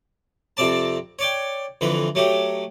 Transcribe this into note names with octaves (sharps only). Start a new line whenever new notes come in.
F2 C3 C4 D5 A5
C#5 D5 G5
F2 D3 E3 B4
F#3 A3 G4